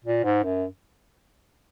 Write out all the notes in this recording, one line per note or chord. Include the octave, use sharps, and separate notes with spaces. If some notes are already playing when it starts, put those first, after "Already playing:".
A#2
G#2
F#2